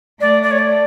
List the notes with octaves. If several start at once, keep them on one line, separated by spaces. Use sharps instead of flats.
A3 D5
D5
C#5
D5